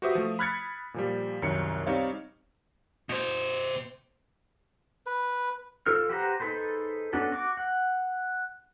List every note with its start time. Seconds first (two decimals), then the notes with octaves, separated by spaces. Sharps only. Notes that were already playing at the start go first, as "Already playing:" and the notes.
0.02 F#4 G4 B4 C5 E5 D#6
0.15 F3 A3
0.39 B5 F6 F#6 G#6 A6 C#7
0.94 A#2 F3 G3
1.42 C2 F#2 D#3 C#5 C#7
1.87 G3 C4 D#4 C#5 D5 F5
3.09 B2 C5
5.06 B4
5.86 F3 F4 A4 F6
6.09 G4 B4 C5 F#5 A#5
6.40 D#4 G#4 A4 B4 C5
7.13 B3 C#4 D4 F#4 A4
7.32 F#4 D6
7.57 F#5